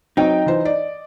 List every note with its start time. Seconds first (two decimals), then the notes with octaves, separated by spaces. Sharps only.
0.17 F#3 C4 D#4 G5
0.46 E3 F4 C5
0.65 D5 D#5